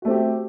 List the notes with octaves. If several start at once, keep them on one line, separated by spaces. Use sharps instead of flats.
A3 C4 F#4 G4